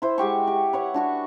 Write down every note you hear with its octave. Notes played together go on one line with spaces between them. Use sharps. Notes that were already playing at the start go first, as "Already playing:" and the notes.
E4 C5
G#3 F#4 G4 C#6
G4
B4 C#5 F#5
D4 F#4 C#6